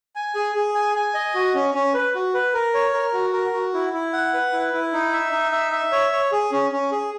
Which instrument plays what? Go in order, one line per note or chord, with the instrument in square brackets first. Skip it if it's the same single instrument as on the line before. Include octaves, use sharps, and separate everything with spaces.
[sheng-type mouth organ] G#5
G#4
G#4
G#5
G#5
D#5
F#4
C#4
C#4
B4
F#4
B4
A#4
C#5
A#4
F#4
A#4
F#4
E4
E4
F#5
B4
E4
E4
D#4
E5
D#4
E5
E5
C#5
C#5
G#4
C#4
C#4
G#4